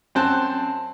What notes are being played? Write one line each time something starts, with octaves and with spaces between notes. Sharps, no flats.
F#2 C4 C5 A5 F#6